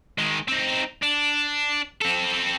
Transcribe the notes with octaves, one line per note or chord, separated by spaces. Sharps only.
D#3 G#3
C4 D#4
D4
C4 A4